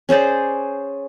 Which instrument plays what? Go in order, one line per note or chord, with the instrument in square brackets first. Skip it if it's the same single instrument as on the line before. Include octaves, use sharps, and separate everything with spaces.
[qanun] C#4 G#4 C5 D5